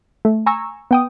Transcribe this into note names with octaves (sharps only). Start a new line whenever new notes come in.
A3
G#5 A#5 C#6 E6
B3 G5 D#6